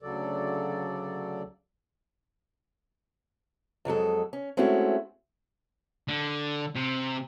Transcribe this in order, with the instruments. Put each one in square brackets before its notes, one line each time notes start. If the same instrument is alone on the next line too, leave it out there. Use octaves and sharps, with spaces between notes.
[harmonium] D2 C#3 F#3 A4 D5
[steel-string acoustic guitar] F2 F#3 G#3 A4
C#4
G#3 A3 C4 C#4 E4 F#4
[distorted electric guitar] D3
C3